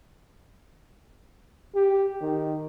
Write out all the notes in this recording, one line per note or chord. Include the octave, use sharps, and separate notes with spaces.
G4
D#3